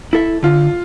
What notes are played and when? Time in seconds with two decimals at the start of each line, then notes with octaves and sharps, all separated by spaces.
0.13 E4 A4 E5
0.43 D3 F4